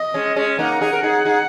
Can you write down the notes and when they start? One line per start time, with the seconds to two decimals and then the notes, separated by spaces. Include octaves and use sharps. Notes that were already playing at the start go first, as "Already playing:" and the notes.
Already playing: D#5
0.14 G#3 C#4
0.36 G#3 C#4
0.59 A#3 D#4 F#5
0.81 D#4 G#4
0.93 A#4
1.03 D#4 G#4
1.26 D#4 G#4